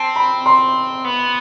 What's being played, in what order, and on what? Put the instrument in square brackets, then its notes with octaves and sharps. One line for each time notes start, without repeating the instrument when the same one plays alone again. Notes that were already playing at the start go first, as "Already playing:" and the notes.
Already playing: [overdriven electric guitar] C4 [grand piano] A5
[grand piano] B5
C6
[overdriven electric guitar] B3